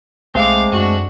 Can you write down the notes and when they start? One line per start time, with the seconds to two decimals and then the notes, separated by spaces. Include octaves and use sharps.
0.35 B1 G#3 A3 C4 F5 D6
0.72 F#2 D4 F#4